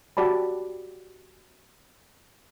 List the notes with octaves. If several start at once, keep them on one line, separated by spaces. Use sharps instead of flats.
F#4 G4 D5 A5 B5